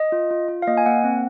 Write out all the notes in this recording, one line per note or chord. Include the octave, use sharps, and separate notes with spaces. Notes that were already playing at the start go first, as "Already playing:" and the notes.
Already playing: D#5
F4
F4
F4
F5
A#3 D#5
G#5
A#3 F#5
C4